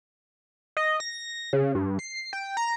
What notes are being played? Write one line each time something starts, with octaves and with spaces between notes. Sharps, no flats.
D#5
A#6
C#3
G2
C7
G5
A#5